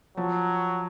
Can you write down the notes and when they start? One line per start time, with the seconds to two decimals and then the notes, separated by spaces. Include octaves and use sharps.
0.17 F3 F#3